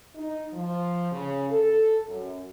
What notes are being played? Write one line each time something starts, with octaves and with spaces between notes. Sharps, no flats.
D#4
F3
C#3
A4
F#2